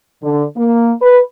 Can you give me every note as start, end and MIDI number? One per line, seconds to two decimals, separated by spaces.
0.23 0.44 50
0.56 0.92 58
1.01 1.20 71